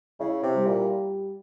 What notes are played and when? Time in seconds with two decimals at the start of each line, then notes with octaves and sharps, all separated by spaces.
0.20 C#3 E4
0.43 C3
0.54 G3
0.66 A#2